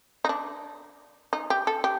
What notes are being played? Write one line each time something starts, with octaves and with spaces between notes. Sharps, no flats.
D#4
D4
D#4
G4
A4
G4